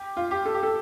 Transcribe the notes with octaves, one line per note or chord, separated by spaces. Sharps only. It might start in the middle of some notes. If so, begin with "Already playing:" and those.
Already playing: G4
F4
G4
A4
G4
A4